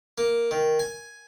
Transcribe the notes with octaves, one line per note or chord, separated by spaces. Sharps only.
A#3
D#3
G#5